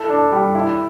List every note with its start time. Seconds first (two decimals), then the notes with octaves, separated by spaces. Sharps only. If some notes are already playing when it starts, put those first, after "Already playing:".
Already playing: E4 A4
0.10 D4
0.32 G3
0.55 E4